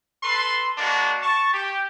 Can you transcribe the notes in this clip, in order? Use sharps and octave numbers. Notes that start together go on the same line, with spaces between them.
A4 B4 C6
G#3 A#3 D4 F#4
A5 C#6
G4